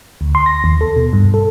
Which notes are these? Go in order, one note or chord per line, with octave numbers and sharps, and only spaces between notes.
D2
C6
A#6
D#2
A4
B2
G2
A4